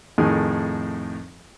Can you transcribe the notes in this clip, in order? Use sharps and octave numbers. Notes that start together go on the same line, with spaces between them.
F2 A2 D#3 G#4 G#5